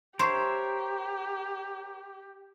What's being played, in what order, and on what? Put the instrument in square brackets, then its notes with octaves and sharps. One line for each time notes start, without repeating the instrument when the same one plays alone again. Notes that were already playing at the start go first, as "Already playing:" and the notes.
[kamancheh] G4 [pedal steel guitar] A#4 C#5 E5 [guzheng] C5 [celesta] C6 C#6 C7